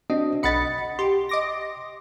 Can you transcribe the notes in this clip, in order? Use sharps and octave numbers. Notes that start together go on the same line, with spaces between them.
C4 D4 F#4 D#5
B1 D#5 F#5 B5 A6 C#7
G4 C6
D#5 D6 A#6